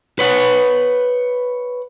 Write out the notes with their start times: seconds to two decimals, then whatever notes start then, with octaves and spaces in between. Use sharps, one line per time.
0.19 B4 C#5 F#5